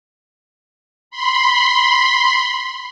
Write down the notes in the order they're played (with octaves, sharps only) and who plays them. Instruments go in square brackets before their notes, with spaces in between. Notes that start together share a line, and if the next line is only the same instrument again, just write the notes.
[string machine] B5 C6